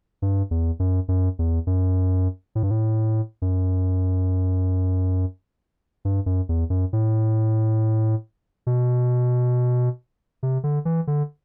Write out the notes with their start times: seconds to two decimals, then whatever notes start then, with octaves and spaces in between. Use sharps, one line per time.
0.22 G2
0.51 E2
0.80 F#2
1.08 F#2
1.39 E2
1.67 F#2
2.55 A2
2.63 G2
2.71 A2
3.42 F#2
6.05 G2
6.26 F#2
6.49 E2
6.70 F#2
6.93 A2
8.67 B2
10.43 C3
10.64 D3
10.85 E3
11.07 D3